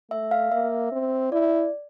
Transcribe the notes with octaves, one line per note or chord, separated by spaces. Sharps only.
A3 E5
F5
A#3 E5
C4
E4 D5